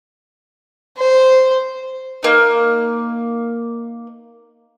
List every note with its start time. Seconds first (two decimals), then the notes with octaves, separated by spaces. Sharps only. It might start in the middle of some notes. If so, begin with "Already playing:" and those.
0.98 C5
2.23 A#3 D#4